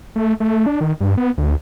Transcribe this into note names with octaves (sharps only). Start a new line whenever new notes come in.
A3
A3
D4
D#3
G2
B3
D2